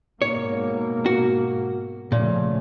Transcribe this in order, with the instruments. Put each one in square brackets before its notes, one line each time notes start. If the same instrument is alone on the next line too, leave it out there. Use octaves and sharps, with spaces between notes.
[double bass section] G#2 B2 A#3 [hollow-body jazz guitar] C#5
[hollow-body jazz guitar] F#4
[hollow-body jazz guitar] A#2 [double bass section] C#3 F3 A3